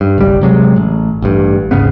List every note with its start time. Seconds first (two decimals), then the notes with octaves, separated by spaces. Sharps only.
0.01 G2
0.18 F#1 B1 G3
0.41 C3 F#3 G#3
0.76 A1
1.22 A1 G2
1.71 D#1 G#1 C#3 B3